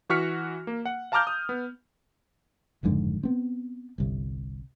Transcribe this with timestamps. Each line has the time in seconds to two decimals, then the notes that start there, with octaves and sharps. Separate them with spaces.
0.10 E3 F#4 C#6 F6 B6 C#7
0.67 A#3
0.85 F#5
1.12 F5 A5 A#5 D6 F6 G6
1.27 D#6
1.49 B3
2.83 F#1 F2 G#2 D3
3.23 B3 C4
3.98 G1 C2